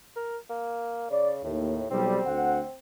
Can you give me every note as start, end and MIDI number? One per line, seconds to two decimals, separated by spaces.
0.16 0.38 70
0.50 1.07 58
1.10 1.43 49
1.10 1.31 74
1.43 1.82 39
1.43 1.87 45
1.90 2.19 35
1.90 2.19 55
1.90 2.77 60
2.26 2.60 38
2.26 2.60 78